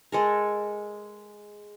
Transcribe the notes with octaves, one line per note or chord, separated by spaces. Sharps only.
G#3 A4 A#4